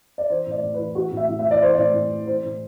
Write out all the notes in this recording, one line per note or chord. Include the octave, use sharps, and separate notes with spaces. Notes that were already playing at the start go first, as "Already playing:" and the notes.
D5
E3 C5
A2
D5
A2
E3 B4
E3 F#4
A2
E5
A2
E5
E3
D5
E3 C5
A2 D5
A2
E3
E3 C5
A2